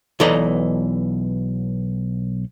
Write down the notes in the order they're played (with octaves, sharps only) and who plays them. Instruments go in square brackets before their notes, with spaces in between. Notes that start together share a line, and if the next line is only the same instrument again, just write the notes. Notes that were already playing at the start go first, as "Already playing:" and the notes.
[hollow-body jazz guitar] B1 E3 A4 D5 D#5 A#5